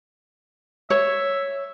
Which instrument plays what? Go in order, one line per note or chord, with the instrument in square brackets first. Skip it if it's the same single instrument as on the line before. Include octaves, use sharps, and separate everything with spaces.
[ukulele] C#5 [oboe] E5